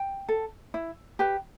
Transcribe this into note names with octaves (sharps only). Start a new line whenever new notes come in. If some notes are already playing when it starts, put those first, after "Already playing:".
Already playing: G5
A4
E4
G4 B4